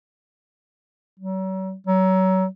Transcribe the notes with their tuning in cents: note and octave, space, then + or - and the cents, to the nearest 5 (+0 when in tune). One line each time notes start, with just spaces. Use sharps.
F#3 +40
F#3 +30